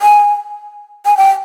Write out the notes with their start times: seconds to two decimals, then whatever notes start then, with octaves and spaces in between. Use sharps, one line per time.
0.02 G#5
1.06 G#5
1.17 G5